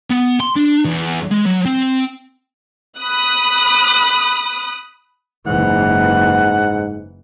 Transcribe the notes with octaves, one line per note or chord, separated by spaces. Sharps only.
B3
C6
D4
E2
G#3
F#3
C4
B5 D#6 F#6
F#1 G#2 E3 F#5